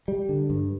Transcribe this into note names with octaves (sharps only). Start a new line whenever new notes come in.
G3
D3
G2